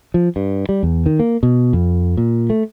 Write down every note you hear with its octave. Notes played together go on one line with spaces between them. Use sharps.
F3
G2
G3
E2
D#3
A#3
B2
F2
A#2
A3